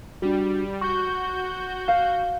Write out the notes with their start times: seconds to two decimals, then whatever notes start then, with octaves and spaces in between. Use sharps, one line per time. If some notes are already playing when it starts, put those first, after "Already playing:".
0.22 G3 D4 F#4
0.81 F#4 C#6 G6
1.88 F5